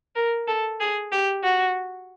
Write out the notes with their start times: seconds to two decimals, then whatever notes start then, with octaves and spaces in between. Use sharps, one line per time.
0.16 A#4
0.48 A4
0.80 G#4
1.12 G4
1.43 F#4